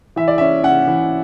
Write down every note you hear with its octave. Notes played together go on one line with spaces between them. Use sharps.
E3 E5
D5
C#4 E5
C#4 F#5
E3